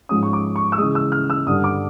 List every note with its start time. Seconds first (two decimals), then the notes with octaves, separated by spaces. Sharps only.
0.09 G#2 F3 G#3 C#4 D#6
0.23 C#6
0.33 D6
0.56 C#6
0.72 E6
0.78 G#3 D#6
0.81 C#3 E3
0.95 E6
1.12 F6
1.30 E6
1.47 G2 D3 G3 D#6
1.64 D6